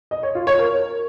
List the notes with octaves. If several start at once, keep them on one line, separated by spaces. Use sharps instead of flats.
D#5
C#5
F4
C#5
A#4